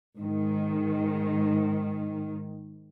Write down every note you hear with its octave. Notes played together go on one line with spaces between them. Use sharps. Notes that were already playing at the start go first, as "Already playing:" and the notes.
G#2 D#3